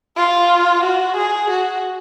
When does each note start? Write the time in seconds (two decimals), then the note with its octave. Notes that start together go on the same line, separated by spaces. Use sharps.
0.17 F4
0.83 F#4
1.16 G#4
1.50 F#4